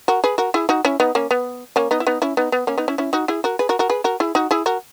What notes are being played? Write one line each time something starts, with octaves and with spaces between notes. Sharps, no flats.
F#4 A#4
G#4 B4
F#4 A#4
E4 G#4
D#4 F#4
C#4 E4
B3 D#4
A#3 C#4
B3
A#3 C#4
B3 D#4
E4
B3 D#4
C#4 E4
B3 D#4
B3
A#3 C#4
B3 D#4
C#4 E4
C#4 E4
D#4 F#4
E4 G#4
F#4 A#4
G#4 B4
F#4 A#4
F#4 A#4
G#4 B4
F#4 A#4
E4 G#4
D#4 F#4
E4 G#4
F#4 A#4